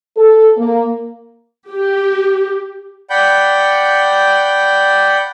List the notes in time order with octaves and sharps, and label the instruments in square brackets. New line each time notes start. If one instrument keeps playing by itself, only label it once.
[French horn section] A4
A#3
[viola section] G4
[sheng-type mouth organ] D5 F#5 G5 B5 G6